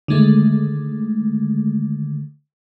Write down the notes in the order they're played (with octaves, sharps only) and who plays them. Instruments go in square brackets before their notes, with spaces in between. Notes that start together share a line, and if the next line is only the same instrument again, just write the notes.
[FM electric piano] D3 D#3 G#3 A3